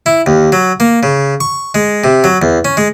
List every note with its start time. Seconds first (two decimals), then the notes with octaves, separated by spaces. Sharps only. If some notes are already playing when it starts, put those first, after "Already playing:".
0.06 E4
0.26 D#2
0.52 F#3
0.80 A#3
1.03 C#3
1.40 C#6
1.75 G#3
2.04 C3
2.24 F#3
2.42 E2
2.65 C#4
2.77 G#3